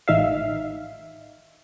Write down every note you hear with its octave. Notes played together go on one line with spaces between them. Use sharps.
A1 D#4 E5 F5